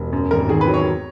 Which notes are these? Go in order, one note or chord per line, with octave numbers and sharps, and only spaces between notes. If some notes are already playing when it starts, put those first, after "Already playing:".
Already playing: E1
F#2
G#1 A#4
D#3 G#4
B4
F#3
C#5